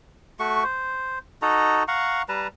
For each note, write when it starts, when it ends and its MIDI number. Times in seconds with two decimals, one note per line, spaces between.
0.40 0.64 57
0.40 0.64 66
0.40 0.64 85
0.64 1.19 72
1.42 1.83 63
1.42 1.83 66
1.42 1.83 69
1.42 1.83 82
1.88 2.22 77
1.88 2.22 78
1.88 2.22 82
1.88 2.22 85
2.29 2.47 55
2.29 2.47 71
2.29 2.47 81
2.29 2.47 82